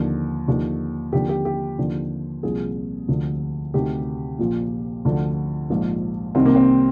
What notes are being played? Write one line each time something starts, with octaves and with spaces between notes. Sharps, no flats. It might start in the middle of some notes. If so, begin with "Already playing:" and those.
Already playing: D#2 D3 F3
D#2 D3 F3
D#2 D3 F3 G4
G4
G4
D#2 D3 F3
C2 A#2 F3 G#4
D2 D3 F3
D2 C3 D#3 G4
A#1 A#2 F3
D2 D3 F3
A#1 G#2 F3
C2 C3 D#3 C4
A#3
C4